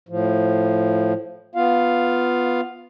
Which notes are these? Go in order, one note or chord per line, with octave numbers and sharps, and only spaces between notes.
A2 F3
B3 F4 F5